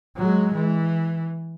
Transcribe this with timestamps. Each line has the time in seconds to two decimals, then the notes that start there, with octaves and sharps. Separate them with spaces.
0.16 F#3 G#3
0.54 E3